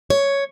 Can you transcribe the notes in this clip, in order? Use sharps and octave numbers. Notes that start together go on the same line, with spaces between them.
C#5